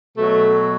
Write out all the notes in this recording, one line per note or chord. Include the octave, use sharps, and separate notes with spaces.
B2 F#3 A3